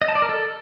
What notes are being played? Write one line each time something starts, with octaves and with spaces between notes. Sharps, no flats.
D#5
A5
D5
A#4
A4